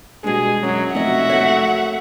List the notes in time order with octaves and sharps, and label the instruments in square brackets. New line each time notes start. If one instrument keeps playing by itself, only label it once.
[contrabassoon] G2 [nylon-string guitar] B2 G#3 [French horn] G#4
[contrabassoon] F#2 [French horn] F#3
[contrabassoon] F1 [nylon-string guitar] D2 D#5 [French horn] F#4 [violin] E5 F#5
[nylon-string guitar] F#2 A3 C#5